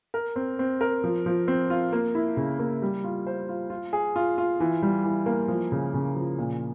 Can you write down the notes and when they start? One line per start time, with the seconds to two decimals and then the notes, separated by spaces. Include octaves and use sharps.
0.14 A#4
0.36 C4
0.59 C4
0.81 A#4
1.04 F3
1.26 F3
1.48 C4
1.70 F4
1.93 A#3
2.15 E4
2.37 C#3
2.59 A#3
2.82 G3
3.04 F4
3.27 C5
3.49 F4
3.70 F4
3.93 G#4
4.16 F4
4.38 F4
4.60 E3
4.82 G3
5.04 E3
5.26 A#3
5.48 F3
5.72 C#3
5.94 C#3
6.16 F3
6.38 A#2